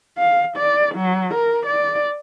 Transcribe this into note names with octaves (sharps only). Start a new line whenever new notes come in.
F5
D5
F#3
A#4
D5